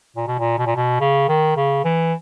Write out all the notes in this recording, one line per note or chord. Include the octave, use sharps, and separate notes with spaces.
A#2
B2
A#2
B2
A#2
B2
C#3
D#3
C#3
E3